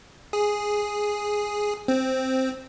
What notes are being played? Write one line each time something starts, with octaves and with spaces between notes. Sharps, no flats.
G#4
C4